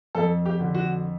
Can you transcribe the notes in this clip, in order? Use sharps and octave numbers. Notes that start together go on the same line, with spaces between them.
F2 A4
G4
D3
F#4